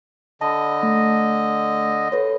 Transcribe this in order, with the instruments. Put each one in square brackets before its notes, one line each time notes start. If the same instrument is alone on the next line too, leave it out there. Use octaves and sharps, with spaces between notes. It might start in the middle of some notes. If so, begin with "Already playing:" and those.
[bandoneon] D3 D#5 [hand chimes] A5 B5
[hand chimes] A3
A4 B4 C#5